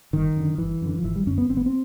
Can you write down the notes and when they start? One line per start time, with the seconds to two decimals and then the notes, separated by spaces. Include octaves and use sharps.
0.13 G1 D#3
0.36 F#2 D3
0.58 G1 E3
0.82 F#2 D3
0.98 F3
1.04 G#1 E3
1.16 G3
1.26 F#2 D3 C#4
1.38 B3
1.49 G#1 C4
1.57 B3
1.66 C4